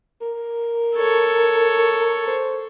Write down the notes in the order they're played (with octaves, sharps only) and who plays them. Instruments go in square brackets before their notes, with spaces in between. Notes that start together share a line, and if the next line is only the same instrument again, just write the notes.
[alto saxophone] A#4
[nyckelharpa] A4 C#5
[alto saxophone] C5